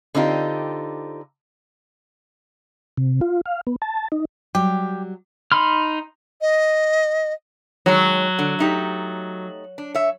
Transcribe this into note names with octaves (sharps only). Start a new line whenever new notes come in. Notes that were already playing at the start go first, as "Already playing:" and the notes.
D3 C4 D#4 F4 G4
C3
F4
F5
B3
A5
D#4
F#3 G3 G4
D#4 B5 C6 F6
D#5
D#3 F#3 G#3 C#5
D3
A3 D#4 G4
D4
C#5 E5